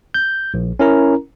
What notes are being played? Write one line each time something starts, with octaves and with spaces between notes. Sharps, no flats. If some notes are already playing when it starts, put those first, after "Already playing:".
G6
A#1
C#4 E4 A#4 A#5